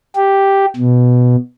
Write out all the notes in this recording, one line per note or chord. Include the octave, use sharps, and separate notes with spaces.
G4
B2